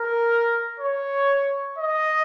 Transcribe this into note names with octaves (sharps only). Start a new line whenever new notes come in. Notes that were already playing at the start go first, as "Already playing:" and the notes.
Already playing: A#4
C#5
D#5